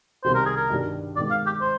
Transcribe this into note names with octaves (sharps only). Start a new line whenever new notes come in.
C2 C3 D#3 G3 C5
A#4
G#4
A#4
G2 D#3 G3 D4
G#1 G#2 D#3 D5
F5
G4
C5